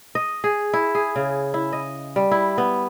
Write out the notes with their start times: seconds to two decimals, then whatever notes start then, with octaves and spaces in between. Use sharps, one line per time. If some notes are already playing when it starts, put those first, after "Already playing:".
0.15 D#5
0.44 G#4
0.74 E4
0.95 G#4
1.16 C#3
1.54 E4
1.73 D#5
2.16 G3
2.31 E4
2.58 B3